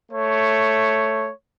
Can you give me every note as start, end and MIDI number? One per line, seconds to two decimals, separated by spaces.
0.11 1.29 57
0.11 1.29 73